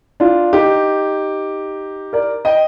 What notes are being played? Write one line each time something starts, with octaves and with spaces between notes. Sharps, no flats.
D4 F4
D#4 G4
A#4 D5
D#5 G5